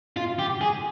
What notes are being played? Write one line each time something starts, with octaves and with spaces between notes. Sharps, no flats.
F4
G4
G#4